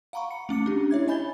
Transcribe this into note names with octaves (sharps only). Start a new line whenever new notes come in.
F5 F#5 A#5 B5 C#6
C#7
A3 C#4 D6 C#7
D4 G4
E4 C#5 E5 G#6
D#5 G#5 B5 G6 A6 G7